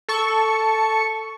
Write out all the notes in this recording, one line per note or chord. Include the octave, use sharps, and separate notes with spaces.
A4 C#6